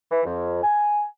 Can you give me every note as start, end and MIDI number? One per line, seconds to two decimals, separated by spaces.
0.10 0.19 52
0.25 0.59 41
0.63 1.05 80